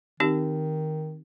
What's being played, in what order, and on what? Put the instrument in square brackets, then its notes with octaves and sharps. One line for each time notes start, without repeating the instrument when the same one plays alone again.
[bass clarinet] D#3 [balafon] C4 D#4 G4